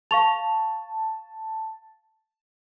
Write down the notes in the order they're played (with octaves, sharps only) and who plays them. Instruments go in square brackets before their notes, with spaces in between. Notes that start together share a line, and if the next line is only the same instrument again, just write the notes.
[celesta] F5 C#6 F7 [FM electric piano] A5